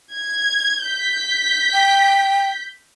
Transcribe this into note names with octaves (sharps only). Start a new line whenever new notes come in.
G#6
G6 B6
G5